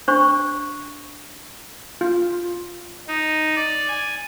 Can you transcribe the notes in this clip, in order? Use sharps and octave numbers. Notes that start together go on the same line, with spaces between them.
D4 C5 C#6
F4
D#4
D5
G#5